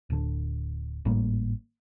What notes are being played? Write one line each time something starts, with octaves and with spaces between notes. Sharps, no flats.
D1 D3
G#1 A2 G3 A#3